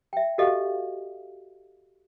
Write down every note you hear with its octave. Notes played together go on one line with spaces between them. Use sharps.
E5 G5
F#4 G4 A4 D#5 F5 F#5